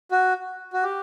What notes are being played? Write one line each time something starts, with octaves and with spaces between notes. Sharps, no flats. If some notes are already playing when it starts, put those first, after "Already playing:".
F#4
F#4
G4